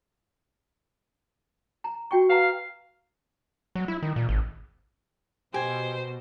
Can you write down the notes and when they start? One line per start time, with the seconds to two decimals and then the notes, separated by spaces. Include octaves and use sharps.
1.84 A#5
2.11 F#4 G5 C#6
2.30 B4 F5 F#5 A#5
3.75 F#3
3.88 E4
4.03 D#3
4.16 A#2
4.29 G#1
5.54 B2 G4 C5 G#5